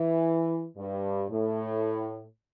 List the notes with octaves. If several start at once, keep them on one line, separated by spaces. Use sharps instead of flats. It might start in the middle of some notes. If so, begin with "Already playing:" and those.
Already playing: E3
G2
A2